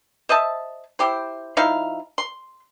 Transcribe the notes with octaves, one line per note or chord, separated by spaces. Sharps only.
C5 D#5 E5 A5
E4 G4 C5
F3 D#4 E4 F5
C6